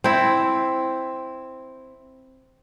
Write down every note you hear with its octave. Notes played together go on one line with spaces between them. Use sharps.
C4 E4